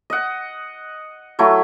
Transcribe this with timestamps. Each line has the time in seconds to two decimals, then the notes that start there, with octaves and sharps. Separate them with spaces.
0.10 D#5 F#5
1.39 F#3 A3 E4